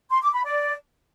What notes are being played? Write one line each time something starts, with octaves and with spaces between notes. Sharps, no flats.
C6
D6
B5
D5